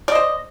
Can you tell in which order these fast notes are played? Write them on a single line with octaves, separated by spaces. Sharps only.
D5 D#5 C5